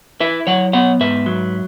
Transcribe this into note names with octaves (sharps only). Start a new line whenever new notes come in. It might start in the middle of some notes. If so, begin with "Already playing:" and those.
E4 B4 E5
F#3 C#5 F#5
B3 C#5 F#5
G#2 B4 E5
F#3